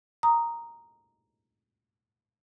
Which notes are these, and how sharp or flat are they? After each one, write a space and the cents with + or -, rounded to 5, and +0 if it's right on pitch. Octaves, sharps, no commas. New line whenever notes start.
A#5 +0 D#6 +0